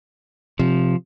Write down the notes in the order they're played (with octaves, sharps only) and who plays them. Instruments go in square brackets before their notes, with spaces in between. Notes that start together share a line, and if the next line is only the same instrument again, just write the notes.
[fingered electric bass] C3 [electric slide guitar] F3